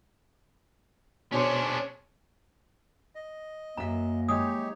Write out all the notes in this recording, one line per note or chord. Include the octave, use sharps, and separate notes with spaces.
B2 C#4 D4 G#4 C5 C#5 C6
D#5
F#2 A#3 E5 A#5
G#3 D#4 G4 C#5 D#6